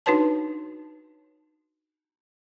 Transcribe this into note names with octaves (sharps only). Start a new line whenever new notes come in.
D4 D#4 F#4 B4 C#5 A5